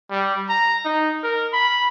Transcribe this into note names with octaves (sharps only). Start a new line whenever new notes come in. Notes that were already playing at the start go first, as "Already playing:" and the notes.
G3
A#5
D#4
A#4
B5